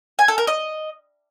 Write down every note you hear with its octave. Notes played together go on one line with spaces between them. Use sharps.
G#5
A4
A#4
D#5